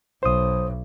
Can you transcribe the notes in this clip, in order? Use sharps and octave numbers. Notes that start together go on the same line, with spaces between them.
B1 C5 D#6